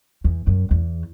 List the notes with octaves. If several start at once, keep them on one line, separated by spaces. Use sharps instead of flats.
E2
F#2
E2